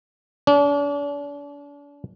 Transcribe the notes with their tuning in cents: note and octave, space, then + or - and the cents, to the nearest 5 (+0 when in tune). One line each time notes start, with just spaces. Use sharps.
D4 -40